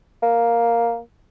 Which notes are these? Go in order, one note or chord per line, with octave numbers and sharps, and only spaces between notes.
A#3